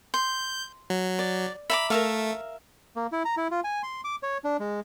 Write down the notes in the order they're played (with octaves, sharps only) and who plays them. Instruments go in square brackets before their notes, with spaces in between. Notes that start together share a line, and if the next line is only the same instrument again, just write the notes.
[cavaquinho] C6 [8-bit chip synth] G6
[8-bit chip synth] F#3
[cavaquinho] D5
[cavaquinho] E5 A#5 D6 [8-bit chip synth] B5
[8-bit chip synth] A3 [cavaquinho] A#4 E5 F5
[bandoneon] A#3
E4
A#5
E4
F4
G#5
C6
D6
C#5
D4
G#3